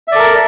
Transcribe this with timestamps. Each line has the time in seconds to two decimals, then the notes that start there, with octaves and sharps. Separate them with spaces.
0.08 E5
0.12 D5
0.15 A4
0.19 A#4